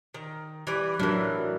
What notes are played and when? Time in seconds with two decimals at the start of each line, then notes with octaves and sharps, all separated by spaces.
0.14 D#3
0.67 E3 G3 B4
0.99 A2 E3 F#3 D4 A#4